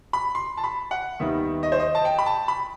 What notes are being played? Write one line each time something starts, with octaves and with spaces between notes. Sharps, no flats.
B5
C6
A5
B5
F#5
D#2 D#3 G3 B3 D#4 E5
D#5
C5
D#5
A5
G5
B5
A5
B5